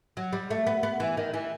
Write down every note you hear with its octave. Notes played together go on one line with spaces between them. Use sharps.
F#3
G3
A3
B3
B3
E3
D#3
E3